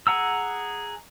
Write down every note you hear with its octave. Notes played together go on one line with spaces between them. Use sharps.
G#4 F#5 A#5 E6